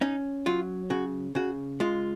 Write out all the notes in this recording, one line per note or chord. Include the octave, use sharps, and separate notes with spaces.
C#4 D#4
F#3 F4
C#3 F#4
C#3 F#4
G#3 F4